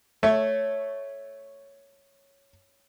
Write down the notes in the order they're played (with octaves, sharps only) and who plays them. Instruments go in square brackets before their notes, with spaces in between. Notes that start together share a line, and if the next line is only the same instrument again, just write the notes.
[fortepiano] A3 [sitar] C#5